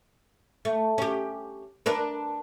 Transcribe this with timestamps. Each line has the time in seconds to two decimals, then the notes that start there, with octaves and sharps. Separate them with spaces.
0.65 A3
0.98 C#4 G4
1.86 D4 A#4 B4